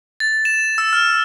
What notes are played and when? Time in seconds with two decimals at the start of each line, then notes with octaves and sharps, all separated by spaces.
0.20 A6
0.45 E7
0.78 E6
0.93 F6